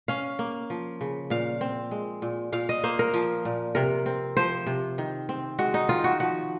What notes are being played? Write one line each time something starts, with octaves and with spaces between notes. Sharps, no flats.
C#4 F5
A#3
F3
C#3
A#2 F5
C4
G#3
A#2
A#2 F5
D#5
A#3 C5
A#4
F3
A#2
C3 A#4
C4
F3 C5
C3
D#3
C4
G#3 F#4
D#4
D#3 F4
F#4
F3 F#4